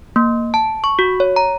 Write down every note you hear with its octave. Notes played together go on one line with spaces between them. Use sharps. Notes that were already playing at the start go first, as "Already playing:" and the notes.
A#3
A5
C#6
F#4
C#5
A#5